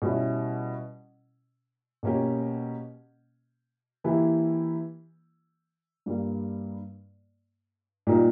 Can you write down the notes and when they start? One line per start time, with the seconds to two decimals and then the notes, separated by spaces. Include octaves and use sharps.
0.02 B2 G3 C#4 E4
2.03 B2 A#3 C#4 G4
4.04 E3 A#3 E4 G4
6.06 G2 G3 A#3
8.07 A#2 G3 A#3 D#4 G4